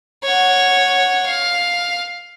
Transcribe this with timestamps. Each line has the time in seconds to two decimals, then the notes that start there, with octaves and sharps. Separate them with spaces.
0.24 C#5 F#5
1.26 F5